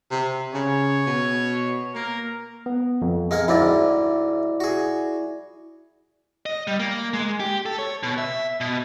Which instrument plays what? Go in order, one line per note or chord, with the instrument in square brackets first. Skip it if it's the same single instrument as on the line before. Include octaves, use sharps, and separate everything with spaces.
[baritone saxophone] C3
[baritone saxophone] C#3 [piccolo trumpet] C#5
[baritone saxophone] B2
[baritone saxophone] A#3 [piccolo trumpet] A#4
[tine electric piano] B3
F2
[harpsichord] G#3 A#3 F#5
[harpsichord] D2 G#2 C4 [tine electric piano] E4 D5
[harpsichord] F#4 G#4
[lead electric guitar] D#5
G3
A#3
G#3
G4
A4
C#5
B2
E5
B2